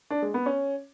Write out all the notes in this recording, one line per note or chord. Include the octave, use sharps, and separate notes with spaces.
D4
G#3
B3
C#4